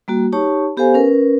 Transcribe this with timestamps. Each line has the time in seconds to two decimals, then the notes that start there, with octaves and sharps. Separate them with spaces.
0.08 G3 A#3 F#4
0.32 D#4 G4 C#5 A5 C#6
0.77 B3 G4 A4 C5 F5 G#5
0.94 C#4 A#4 B4